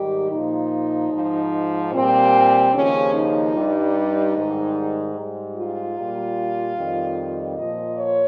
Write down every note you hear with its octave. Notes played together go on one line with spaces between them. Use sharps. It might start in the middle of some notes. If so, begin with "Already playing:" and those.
Already playing: G#2 D#3 G3 G4
A#2 F3 D#4
G#2 F3
A#2 G3 C4
D#2 C#3 F3 C#4
D#4
G2 G3
G#2 D#3 G3
G#2 G3
F4
G3
A#2
F2 D#3 G3
A#2 F3 D#5
C#5